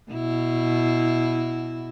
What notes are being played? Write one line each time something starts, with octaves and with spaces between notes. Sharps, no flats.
B2 E4